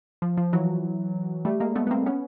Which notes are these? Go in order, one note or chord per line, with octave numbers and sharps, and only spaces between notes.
F3
F3
E3 F#3
G3 A3
G#3 A#3
A3 B3
B3
A#3 C4
B3 C#4